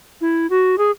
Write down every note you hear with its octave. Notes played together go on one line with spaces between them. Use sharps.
E4
F#4
G#4